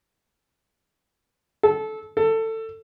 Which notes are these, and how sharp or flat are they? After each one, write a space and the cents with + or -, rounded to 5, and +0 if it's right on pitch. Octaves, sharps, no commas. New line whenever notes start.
A4 -20
A4 +20